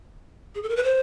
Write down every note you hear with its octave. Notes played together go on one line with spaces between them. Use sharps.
G#4
A4
A#4
B4
C5